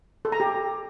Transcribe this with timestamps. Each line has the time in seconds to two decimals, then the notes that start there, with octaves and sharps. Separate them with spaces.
0.25 A4
0.32 A#5
0.40 G4